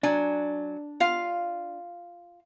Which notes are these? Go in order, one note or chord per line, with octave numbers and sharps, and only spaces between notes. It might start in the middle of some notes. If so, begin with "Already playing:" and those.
F#3 D4 G#5
F4 F5